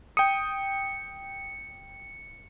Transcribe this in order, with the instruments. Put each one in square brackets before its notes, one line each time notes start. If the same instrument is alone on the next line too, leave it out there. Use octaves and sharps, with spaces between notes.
[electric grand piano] G5 D#6 [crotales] C#7